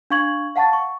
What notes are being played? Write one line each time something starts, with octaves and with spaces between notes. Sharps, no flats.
D4 F5 C#6 G#6 F#7
F5 F#5 A5 C#6 A6
C#6